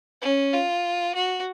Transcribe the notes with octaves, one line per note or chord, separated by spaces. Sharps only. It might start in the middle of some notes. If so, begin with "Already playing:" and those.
C#4
F4
F#4